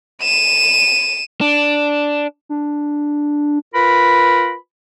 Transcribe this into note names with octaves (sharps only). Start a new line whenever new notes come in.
D#7 E7
D4
D4
F4 A#4 B4 B5